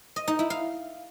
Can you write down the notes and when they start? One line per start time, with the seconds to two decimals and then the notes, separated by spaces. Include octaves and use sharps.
0.16 D#5
0.28 D#4
0.39 E4
0.50 F5